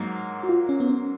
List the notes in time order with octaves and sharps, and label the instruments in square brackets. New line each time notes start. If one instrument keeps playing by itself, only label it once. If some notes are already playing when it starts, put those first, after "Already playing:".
Already playing: [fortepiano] G#2 F#3 A#3
[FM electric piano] F#4
F4
C#4
B3
C#4